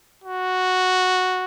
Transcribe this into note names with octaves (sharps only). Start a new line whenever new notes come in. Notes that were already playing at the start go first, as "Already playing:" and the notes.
F#4